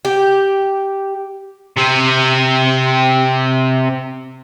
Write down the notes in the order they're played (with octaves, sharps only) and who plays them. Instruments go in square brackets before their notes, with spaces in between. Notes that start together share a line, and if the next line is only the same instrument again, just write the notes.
[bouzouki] G4
[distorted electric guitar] C3 C4